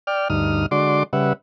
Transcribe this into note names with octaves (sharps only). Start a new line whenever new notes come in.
D5 G5 F6
D2 G2 D#4 D#6 F6
D3 G#3 F#4 D5 C6 D6
C#3 G3 B4 E5 F#5